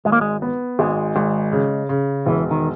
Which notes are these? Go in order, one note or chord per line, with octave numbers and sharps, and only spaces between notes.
G#1 G#3
A#3
G#3
B3
G#1 G#3
G#1
C#3
C#3
E1 E3
D#3